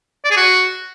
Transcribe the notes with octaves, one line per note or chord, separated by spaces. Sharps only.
D5
G#4
F#4